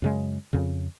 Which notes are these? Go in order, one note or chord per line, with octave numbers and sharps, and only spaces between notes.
F#2 C#3 G#3
F2 C#3